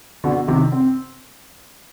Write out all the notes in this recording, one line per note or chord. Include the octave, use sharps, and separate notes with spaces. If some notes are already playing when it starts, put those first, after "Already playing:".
B2 D3
C3 D#3
C4